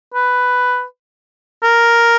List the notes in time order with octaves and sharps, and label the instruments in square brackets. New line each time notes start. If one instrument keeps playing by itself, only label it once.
[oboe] B4
A#4